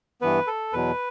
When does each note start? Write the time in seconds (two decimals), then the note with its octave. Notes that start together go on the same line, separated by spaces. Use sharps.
0.21 G2 E3 B3 B4
0.47 A4
0.73 E2 B2 F#3 B4